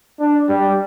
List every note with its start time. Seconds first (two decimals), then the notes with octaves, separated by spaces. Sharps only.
0.19 D4
0.49 G3